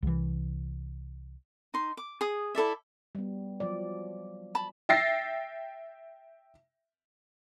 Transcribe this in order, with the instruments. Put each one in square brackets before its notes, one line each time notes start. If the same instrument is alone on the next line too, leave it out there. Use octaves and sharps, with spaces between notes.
[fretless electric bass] C2 E3
[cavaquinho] D#4 C6
D6
G#4 D#6
E4 A4 D5 E5
[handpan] G3 B3
F3 F#3 D5
[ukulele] A5 B5
[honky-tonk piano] E5 G5 A6 A#6 C7